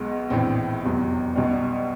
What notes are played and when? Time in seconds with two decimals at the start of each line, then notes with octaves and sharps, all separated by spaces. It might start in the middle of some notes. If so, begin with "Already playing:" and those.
Already playing: B1 B2 G#3
0.30 A#1 A2 E3 C4
0.83 F1 E2 B2 F#3
1.36 B1 B2 G3